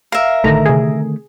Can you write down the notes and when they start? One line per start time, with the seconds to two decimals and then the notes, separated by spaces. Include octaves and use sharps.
0.12 A#4 E5 F5
0.44 A1 D3 D#3 A3 A#5
0.66 C3 G#4